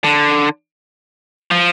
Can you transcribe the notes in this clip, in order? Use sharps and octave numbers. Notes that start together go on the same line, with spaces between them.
D3
F3